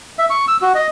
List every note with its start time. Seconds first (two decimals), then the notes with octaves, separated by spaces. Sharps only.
0.19 E5
0.30 C#6
0.48 E6
0.62 F#4
0.75 D#5